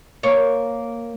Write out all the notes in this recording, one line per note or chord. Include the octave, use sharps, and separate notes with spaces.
A#3 C#5